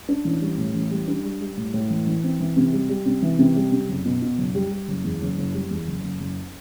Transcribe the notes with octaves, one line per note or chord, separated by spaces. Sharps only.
D4
A1
G3
A2
A1
G3
D4
G3
G3
A2
A2
E3
E3
C4
E3
C3
G3
G3
C3
E3
C3
G3
C3
F#1
B2
B2
F#1
G3
G3
F#1
E2
F#1
F#1
G3
E2
F#1
F#1
F#1